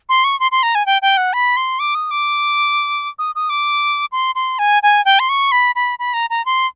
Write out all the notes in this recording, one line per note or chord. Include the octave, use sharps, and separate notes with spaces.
C6
C#6
C6
C6
A#5
G#5
G5
G5
F#5
B5
C6
D6
D#6
D6
D#6
D#6
D6
C6
C6
G#5
G#5
G5
C6
C#6
B5
B5
B5
A#5
A#5
C6